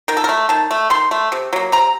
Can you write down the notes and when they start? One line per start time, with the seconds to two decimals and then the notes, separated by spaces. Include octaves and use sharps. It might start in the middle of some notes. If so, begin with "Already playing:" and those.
0.08 D#3 A#4
0.17 A4
0.24 A#4
0.29 A3
0.49 D#3 A5
0.71 A3
0.90 D#3 C6
1.11 A3
1.32 C3
1.53 F#3 A#3
1.72 C3 A#5